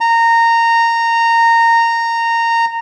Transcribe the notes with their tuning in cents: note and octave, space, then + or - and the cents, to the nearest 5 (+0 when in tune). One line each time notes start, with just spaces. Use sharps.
A#5 -15